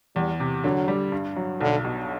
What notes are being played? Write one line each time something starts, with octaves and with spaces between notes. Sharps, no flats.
E2 G3
C3
D3 F#3
G3
G2
F#3
B1 D3
B2